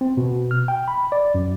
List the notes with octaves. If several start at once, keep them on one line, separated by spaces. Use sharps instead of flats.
C4
B2
F6
G5
B5
D5
F#2